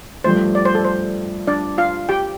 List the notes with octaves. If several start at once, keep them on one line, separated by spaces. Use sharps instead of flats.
G2 F3 A3 C5
D5
C5
A4
C5
D4 D5
F4 F5
G4 G5